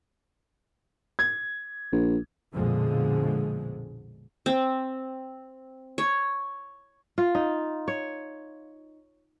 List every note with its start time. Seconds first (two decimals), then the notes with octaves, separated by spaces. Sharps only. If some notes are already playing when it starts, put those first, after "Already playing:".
1.19 G#6
1.92 A#1
2.53 A#1 F2 B2 D3 F3 G#3
4.46 C4
5.98 C#5
7.18 F4
7.35 D#4
7.88 C#5